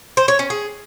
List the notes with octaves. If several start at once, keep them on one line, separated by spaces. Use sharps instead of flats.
C5
C#5
C#4
G#4